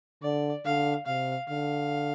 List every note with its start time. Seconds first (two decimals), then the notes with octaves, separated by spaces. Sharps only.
0.22 D3 D5
0.65 D3 F5
1.06 C3 F5
1.48 D3 F5